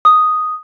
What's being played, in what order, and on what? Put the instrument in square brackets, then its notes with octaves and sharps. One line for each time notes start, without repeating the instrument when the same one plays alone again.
[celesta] D#6